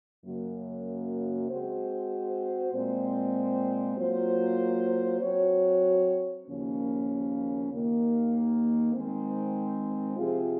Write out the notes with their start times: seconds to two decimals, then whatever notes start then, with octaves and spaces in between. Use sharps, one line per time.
0.25 F#2 C#3 F#3 A#3
1.49 G#3 C4 F#4 C5
2.73 A#2 G#3 C4
3.97 F#3 A#3 F4 C5
5.21 F#3 C4 F#4 C#5
6.45 D#2 C#3 F3 A#3 C#4
7.70 D#2 D#3 A#3
8.93 D#3 G#3 C4
10.17 C3 F3 C4 F4 G#4